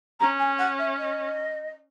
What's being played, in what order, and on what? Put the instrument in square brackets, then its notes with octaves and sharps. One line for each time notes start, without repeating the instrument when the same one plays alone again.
[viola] C#4 [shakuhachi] A#5
[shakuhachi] G#5
F#5
E5
D#5